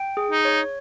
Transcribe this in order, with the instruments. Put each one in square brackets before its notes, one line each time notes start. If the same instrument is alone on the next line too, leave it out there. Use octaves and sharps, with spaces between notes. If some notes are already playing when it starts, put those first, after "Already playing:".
Already playing: [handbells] G5
G#4
[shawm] D#4
[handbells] C#5